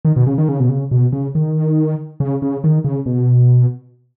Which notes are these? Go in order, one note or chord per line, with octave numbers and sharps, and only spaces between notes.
D#3
B2
C#3
D#3
C#3
B2
C#3
B2
C#3
D#3
C#3
C#3
D#3
C#3
B2